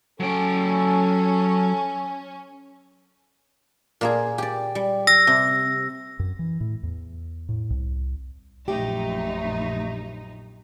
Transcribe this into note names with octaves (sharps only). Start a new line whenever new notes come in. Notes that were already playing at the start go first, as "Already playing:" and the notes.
F#3 C#4 A4 G5
A#2 A#3 G#4
G4 D5
G3
E6 A#6
C3
F#2
E3
A2
E2
A2
C2
A#1 F#2 A3 D#4 G4